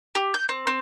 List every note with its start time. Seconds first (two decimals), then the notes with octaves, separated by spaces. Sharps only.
0.15 G4
0.34 G6
0.49 C4
0.67 C4